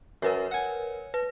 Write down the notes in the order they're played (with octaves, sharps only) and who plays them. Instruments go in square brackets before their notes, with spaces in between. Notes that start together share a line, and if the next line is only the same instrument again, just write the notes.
[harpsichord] F#2 [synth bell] A#4 B4 C#5
[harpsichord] F#5 G#5
[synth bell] B4